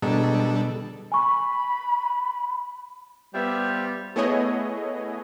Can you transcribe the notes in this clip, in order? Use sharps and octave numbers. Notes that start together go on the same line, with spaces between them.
B2 G3 G#3 D4 A4 A#5
G#5 B5 C#6
G3 B3 F4 G4 C5 E5
A3 B3 E4 G#4 C#5 D#5